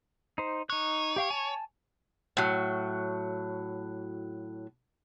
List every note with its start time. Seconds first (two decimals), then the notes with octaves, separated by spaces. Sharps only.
0.38 D#4 C5
0.70 D#4 C#5 F#6
1.16 G4 F5 G5
1.30 G#5 A5
2.37 A2 F#3